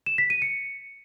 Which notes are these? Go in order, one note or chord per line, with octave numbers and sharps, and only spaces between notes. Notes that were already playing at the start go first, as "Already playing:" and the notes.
E7
B6
D#7
C#7